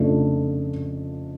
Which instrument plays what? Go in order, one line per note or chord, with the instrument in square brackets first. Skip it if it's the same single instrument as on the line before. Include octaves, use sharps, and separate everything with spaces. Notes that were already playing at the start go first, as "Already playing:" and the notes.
Already playing: [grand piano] F2 C#3 F3 A3 D4